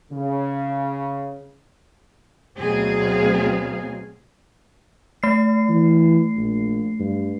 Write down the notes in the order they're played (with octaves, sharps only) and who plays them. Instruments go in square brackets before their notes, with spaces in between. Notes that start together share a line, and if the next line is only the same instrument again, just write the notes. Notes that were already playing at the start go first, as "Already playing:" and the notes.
[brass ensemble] C#3
[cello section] D2 B2 F#3 C4 G#4 F5
[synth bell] A3 C7
[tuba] E3
A#1
G2